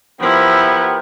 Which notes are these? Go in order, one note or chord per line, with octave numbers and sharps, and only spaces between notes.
F3 B3 E4 G4 A#4